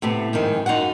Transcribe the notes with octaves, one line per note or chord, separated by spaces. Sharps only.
A2 C3 A3 B3
F2 G#2 D#3
F#2 D#4 F4 F#4 F#5